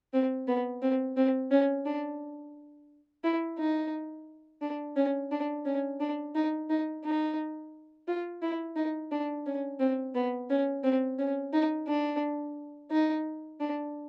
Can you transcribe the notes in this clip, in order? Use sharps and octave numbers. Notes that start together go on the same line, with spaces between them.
C4
B3
C4
C4
C#4
D4
E4
D#4
D4
C#4
D4
C#4
D4
D#4
D#4
D#4
F4
E4
D#4
D4
C#4
C4
B3
C#4
C4
C#4
D#4
D4
D#4
D4